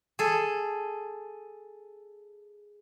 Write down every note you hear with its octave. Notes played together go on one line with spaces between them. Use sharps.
G#4 A4